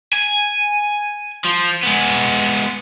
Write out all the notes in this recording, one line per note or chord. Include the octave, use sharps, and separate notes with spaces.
G#5
F3
G#3 B3